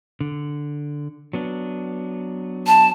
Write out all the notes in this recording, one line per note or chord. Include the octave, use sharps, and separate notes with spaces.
D3
F#3 B3 D4
A5